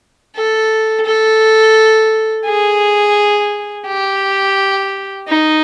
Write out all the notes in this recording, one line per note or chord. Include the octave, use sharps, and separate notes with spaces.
A4
A4
G#4
G4
D#4